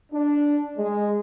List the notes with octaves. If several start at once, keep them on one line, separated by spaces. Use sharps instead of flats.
D4
G#3